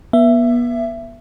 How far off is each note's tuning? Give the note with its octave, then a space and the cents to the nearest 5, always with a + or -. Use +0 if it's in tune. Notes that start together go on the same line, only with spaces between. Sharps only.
B3 -35 E5 +20